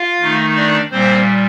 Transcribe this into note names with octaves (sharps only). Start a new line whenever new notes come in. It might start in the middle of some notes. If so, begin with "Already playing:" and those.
Already playing: F4 F5
D#3 A3 D#4
D4 D5
A#2 G3 A#3 C4 C5